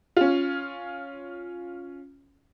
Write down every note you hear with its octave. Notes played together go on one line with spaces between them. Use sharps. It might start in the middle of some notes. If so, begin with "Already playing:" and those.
C#4 F4